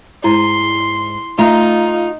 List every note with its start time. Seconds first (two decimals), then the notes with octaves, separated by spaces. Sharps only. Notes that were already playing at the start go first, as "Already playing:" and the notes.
0.24 G#2 E4 C6
1.39 A3 D#4 F4 A#5